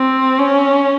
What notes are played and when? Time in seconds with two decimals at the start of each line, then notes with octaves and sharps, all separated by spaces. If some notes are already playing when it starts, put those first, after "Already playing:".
Already playing: C4
0.39 C#4